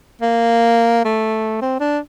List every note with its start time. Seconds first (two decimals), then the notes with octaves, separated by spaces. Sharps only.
0.22 A#3
1.05 A3
1.61 C4
1.80 D4